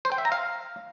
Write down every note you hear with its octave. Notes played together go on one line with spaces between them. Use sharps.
C5
G5
E5
A#5
F5